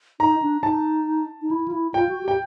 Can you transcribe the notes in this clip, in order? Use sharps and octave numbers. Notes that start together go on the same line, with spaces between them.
D#4 A#5
D4
D#4 A5
D#4
E4
F4
E4
F4 G5
F#4
G4 G5